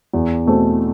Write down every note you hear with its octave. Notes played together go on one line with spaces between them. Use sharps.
E2
B2 A3 C4